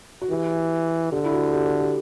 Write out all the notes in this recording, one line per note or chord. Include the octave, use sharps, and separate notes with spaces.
F#4
E3 G4
D3 G4
E4
F#4
G4
A4
G4